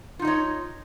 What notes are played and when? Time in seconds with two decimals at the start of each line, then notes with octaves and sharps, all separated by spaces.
0.19 F4
0.22 D#4
0.25 D#5
0.27 C#5